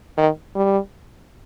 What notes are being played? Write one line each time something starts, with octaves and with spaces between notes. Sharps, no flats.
D#3
G3